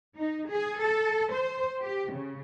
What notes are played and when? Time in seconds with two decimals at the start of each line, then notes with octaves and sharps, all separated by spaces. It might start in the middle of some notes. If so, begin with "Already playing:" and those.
0.19 D#4
0.50 G#4
0.80 A4
1.31 C5
1.81 G4
2.11 C#3